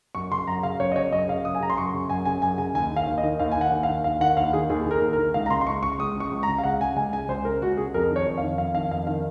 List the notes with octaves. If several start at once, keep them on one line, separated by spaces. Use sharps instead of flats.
F#2 C#6
C#3 C6
F#2 A#5
C#3 F5
F#2 C#5
D#5
C#3 C#5
F#2 D#5
C#3 F5
F#2 D#6
G#5
C#3 A#5
C6
F#2 C#6
C#3
F#2 G#5
C#3 G#5
F#2 G#5
C#3 G#5
D#2 G#5
D#3
F5
D#2
D#5
D#3
D#2 F5
D#3 G#5
F#5
D#2
F5
D#3
D#2 F5
D#3 F#5
D#2 F5
D#3 G#4
D#2 G#4
D#3
A#4
D#2
A#4
D#3
C#2 F5
A#5
C#3 C6
C6
C#2 C#6
C#3 C#6
C#2 D#6
C#3 C#6
C#2
A#5
C#3
F5
C#2 F#5
C#3 G#5
C#2 G#5
C#3 G#5
C#2 C5
C#3 A#4
C#2 F#4
C#3 G#4
F2 A#4
D#3
C#5
F2
F5
D#3
F2 F5
D#3 F5
F2 F5
D#3 F5